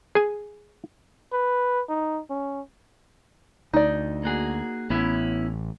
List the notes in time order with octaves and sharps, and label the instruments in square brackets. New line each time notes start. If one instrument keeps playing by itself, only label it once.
[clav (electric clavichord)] G#4 G#5
[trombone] B4
D#4
C#4
[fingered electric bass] D2 [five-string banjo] D#4 D5
[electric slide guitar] A#3 F#4 G#4
[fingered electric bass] A1 [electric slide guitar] B3 C#4 E4